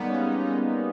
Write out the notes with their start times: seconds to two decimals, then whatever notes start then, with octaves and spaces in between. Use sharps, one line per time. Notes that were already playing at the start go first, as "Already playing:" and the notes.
Already playing: G3 G#3 A#3 B3 D#4
0.08 C#4
0.24 D#4
0.39 D#4